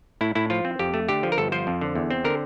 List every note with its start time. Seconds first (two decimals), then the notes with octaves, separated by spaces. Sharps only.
0.21 A2 E4
0.35 A2 E4
0.50 F3 F4
0.65 C4
0.79 F2 G4
0.94 A3
1.09 D3 G4
1.23 F3
1.32 A#4
1.38 G1 A4
1.52 F3 C5
1.67 F2
1.81 D3
1.95 E2
2.10 C4
2.24 D3 A#4